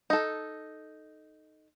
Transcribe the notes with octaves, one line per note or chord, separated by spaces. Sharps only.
D#4 A4